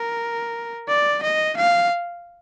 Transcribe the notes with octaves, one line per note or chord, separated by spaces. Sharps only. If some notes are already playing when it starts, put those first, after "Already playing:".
Already playing: A#4
D5
D#5
F5